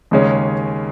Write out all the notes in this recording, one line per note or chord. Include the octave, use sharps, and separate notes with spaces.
D#2 C#3 G#3 C#4 G#4